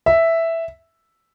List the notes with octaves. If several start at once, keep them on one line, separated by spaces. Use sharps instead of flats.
E5